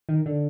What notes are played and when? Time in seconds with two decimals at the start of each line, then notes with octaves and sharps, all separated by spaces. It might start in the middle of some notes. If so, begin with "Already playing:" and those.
0.09 D#3
0.26 D3